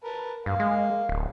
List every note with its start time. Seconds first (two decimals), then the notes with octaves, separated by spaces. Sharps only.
0.04 A#4 B4 A5
0.46 G2 A#3 F5
0.60 G#3
1.09 D1